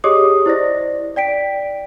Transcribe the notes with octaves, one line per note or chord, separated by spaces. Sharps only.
G4 G#4 C#5 D#5 D6 D#6
E4 C5 D5 A#6
D5 G5 B6 D7